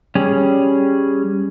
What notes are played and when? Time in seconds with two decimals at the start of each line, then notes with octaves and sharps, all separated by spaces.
0.15 G3 C#4 G#4